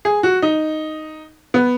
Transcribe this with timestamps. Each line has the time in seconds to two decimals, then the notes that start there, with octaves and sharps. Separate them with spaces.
0.05 G#4
0.23 F#4
0.42 D#4
1.54 B3